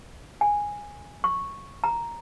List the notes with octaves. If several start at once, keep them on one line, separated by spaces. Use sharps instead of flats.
G#5
C#6
A#5